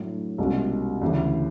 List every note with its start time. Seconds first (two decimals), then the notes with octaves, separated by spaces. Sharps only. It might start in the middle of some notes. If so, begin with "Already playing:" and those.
Already playing: A2 F#3 A3 D4
0.38 C2 B2 G#3 C#4 F#4
1.01 D2 C#3 E3